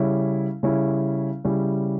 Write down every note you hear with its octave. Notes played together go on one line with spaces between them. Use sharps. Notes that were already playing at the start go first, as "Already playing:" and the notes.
Already playing: C#3 G3 C#4 E4
C#3 G3 C#4 E4
C#3 G3 C#4 E4